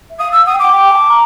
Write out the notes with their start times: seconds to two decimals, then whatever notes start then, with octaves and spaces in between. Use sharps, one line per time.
0.10 E5
0.18 F5 D#6
0.32 E6
0.46 F#5 D#6
0.53 G5
0.59 F#5 D6
0.72 G5
0.90 A5
1.09 A#5